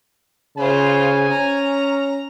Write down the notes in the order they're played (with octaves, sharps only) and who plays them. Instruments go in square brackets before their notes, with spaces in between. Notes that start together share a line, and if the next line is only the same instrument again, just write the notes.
[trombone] C#3 [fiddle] F4 C5 [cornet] G#5
[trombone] C#4 [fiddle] A#5